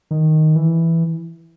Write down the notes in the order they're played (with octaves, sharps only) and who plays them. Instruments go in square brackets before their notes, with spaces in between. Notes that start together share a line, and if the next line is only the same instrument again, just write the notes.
[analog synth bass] D#3
E3